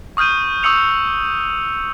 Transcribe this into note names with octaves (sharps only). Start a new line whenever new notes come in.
C#6 D#6 F6 G6 D#7
C#6 D#6 E6 C#7 F7